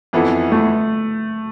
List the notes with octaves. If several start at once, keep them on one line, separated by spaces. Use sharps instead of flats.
F2 E3 B3 E4 A4
A3